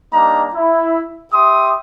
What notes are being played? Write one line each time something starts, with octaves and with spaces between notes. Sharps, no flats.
G3 A#3 D4 D#4 A#5
E4
G4 E5 C6 D#6